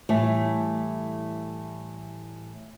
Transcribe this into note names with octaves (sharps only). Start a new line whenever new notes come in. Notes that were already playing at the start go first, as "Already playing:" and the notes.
A2 E3 G3 A3